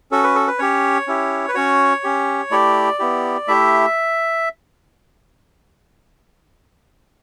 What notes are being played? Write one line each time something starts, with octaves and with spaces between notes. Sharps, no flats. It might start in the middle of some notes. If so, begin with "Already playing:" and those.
C#4 F#4 A4
B4
A4
B4
C#4 G4 C#5
C#4 E4 G4
B4
C#4 F#4 C#5
C#4 G4
A3 E4 G4 D5
B3 E4 G4
A3 E4 G4 E5